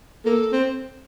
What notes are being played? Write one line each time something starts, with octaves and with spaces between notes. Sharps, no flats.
A#3 A4
C4